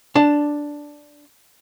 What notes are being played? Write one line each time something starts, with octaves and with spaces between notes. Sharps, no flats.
D4 A5